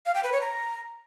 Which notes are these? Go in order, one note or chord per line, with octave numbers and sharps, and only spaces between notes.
F5
G5
B4
C#5
A#5